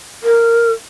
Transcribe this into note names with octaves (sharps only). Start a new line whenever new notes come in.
A#4